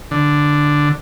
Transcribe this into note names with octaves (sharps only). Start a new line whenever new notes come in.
D3